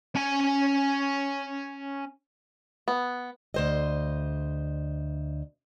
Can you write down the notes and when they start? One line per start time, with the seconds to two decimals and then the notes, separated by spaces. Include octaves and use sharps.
0.16 C#4 G#5
2.88 B3
3.54 D2 C5 D#5